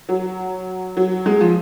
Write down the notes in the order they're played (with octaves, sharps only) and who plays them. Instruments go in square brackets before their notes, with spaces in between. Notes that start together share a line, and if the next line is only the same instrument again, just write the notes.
[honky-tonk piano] F#3
F#3
G#3
F3